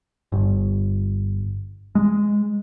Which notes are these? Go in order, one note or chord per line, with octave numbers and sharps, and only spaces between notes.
G1
G#3